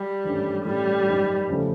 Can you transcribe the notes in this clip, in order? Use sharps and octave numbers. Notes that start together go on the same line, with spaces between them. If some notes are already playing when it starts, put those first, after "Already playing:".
Already playing: G3
G#1 G2 E3 A3 C#4
A2 E3 G3 A3 C#4 E4
G#1 F#2 D#3
F2 C#3 E3 A3